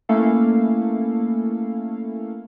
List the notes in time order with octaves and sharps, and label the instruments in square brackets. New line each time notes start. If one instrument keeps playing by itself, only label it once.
[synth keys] A3 A#3 C#4 E4 A4 F5